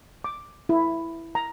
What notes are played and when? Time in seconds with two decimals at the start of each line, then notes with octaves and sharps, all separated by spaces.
0.24 D6
0.69 E4
1.35 A#5